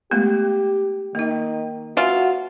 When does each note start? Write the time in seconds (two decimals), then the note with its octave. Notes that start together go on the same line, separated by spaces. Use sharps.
0.11 G#3 A3 B3 G4
1.15 D#3 A#3 D#4
1.97 F#3 F4 F#4 B4 E5 G#5